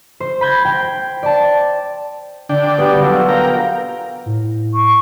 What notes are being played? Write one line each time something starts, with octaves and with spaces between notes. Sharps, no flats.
C5
B5 G6 G#6 A#6
C5 G5
D5 A5
D3 D4 G5
B2 G3 F#4
F#3 F4 A4
A#4 F5 G5 A#5
A2
C#6